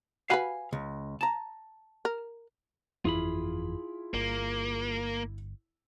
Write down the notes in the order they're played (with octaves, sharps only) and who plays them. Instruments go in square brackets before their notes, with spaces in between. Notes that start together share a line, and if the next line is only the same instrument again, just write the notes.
[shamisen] F#4 B4 [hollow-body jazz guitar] F5 G#5 B5
[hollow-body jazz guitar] C#2
A5 A#5
[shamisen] A#4
[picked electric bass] G1 F2 E3 [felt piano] E4 [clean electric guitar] F4 G#4 B5
[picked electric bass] G1 [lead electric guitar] A#3